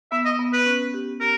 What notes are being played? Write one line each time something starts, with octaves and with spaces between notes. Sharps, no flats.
B3 E5
D#5
B3
B4
C#4
G4
G4 A#4